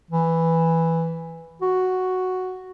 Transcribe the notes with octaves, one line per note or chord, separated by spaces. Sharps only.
E3
F#4